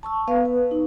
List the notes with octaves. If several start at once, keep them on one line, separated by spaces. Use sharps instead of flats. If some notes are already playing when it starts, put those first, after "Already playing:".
A5 C#6 E6
B3 B4 F5
B4
D#4